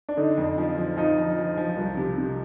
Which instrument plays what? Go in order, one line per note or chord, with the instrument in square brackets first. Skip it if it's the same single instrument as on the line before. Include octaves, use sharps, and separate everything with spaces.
[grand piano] D4
[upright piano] D3 [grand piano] D#4
[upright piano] F2
F3
F3
[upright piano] F3 [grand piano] D#4
[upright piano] F3
F3
F3
C2
C3
C3